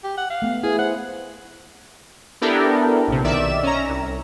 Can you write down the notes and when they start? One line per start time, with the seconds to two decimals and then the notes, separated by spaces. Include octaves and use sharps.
0.04 G4
0.17 F#5
0.30 F5
0.42 A3 B3
0.63 E4 G#4 B4
0.79 C5 F#5
2.41 B3 D4 E4 G4 A4 A#4
3.07 A#1 C3
3.24 B1 D#3 D5 E5 E7
3.63 C#4 A#5
3.88 C2